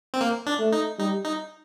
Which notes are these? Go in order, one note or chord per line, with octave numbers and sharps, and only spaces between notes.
C4
A#3
D4
A3
D#4
G3 D#4
D#4